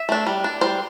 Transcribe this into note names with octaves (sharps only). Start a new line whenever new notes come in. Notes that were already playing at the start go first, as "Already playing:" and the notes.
Already playing: E5
A3 D4
G3
D4
G3 C5